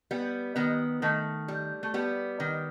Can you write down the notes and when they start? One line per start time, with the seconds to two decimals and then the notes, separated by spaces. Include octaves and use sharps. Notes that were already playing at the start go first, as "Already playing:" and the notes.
0.11 G3 B3
0.56 D#3 B3
1.02 D#3 A3
1.48 G3
1.83 A3
1.94 G3 B3
2.40 D#3